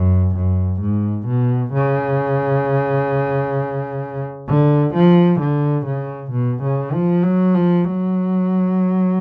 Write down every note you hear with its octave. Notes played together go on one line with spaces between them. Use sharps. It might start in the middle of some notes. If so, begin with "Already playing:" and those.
Already playing: F#2
F#2
G#2
B2
C#3
D3
F3
D3
C#3
B2
C#3
F3
F#3
F3
F#3